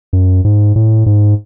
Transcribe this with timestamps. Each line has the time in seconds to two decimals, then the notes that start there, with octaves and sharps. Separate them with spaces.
0.13 F#2
0.45 G#2
0.76 A2
1.06 G#2